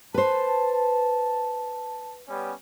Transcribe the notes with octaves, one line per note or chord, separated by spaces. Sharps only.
B4 C5 A5
G3 B3 C#4